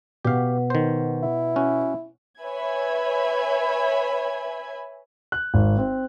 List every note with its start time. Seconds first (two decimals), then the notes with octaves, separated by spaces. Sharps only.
0.25 B2 G4 B4 F5 F#5
0.70 D#3 C5
1.23 E4
1.56 C#4 F#4
2.40 B4 C#5 E5 G#5 B5 G#6
5.32 F#6
5.54 G#1
5.78 C4